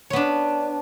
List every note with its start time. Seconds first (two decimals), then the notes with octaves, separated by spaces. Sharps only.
0.10 C#5
0.13 B3
0.16 D4